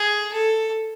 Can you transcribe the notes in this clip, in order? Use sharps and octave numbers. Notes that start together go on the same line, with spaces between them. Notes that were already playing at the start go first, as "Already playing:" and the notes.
Already playing: G#4
A4